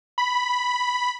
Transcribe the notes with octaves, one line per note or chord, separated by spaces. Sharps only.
B5